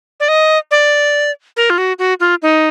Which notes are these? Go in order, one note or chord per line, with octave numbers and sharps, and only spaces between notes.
D5
D#5
D5
A#4
F4
F#4
F#4
F4
D#4